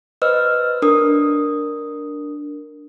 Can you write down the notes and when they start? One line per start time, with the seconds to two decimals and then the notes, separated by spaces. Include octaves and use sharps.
0.22 B4 C5 D#5 E6 F6
0.82 D4 A#4 D#6